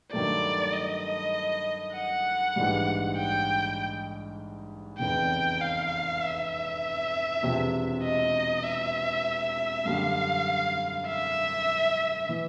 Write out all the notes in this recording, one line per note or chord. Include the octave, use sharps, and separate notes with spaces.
G2 D#3 F#3 A3 D5
D#5
F#5
A#1 G#2 E3 G3
G5
F1 E2 C#3 G5
F5
E5
E1 E2 C3 F3
D#5
E5
F#2 D3 G3 F5
E5
E3